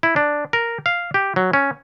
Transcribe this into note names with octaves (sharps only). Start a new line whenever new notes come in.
E4
D4
A#4
F5
G4
F#3
C#4